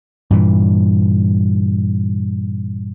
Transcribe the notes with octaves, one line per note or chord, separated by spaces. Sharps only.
G2 A#2 E3